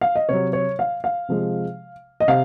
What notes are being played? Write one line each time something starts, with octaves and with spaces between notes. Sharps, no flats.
F5
D#5
C3 F#3 C#5
C#5
F5
F5
C3 F3 G#3
D#5
C3 F5